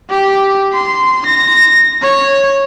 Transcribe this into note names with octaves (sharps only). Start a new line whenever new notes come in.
G4
C6
A#6
C#5